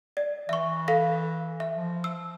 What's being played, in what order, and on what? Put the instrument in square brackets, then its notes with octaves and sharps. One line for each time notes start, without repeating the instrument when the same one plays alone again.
[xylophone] D5
[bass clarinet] E3 [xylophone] E5 C#6
[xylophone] A4 F5 A#6
E5
[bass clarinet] F3
[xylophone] E6